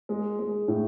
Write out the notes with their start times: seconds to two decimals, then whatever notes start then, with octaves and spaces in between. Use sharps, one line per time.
0.09 G#3
0.39 G#3
0.68 A2